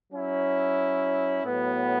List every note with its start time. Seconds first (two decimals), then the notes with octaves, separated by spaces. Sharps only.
0.11 F#3 C#4 E4
1.44 A2 F#3 B3